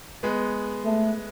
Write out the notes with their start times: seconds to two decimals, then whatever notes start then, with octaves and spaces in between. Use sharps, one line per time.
0.23 G#3 B3
0.85 A3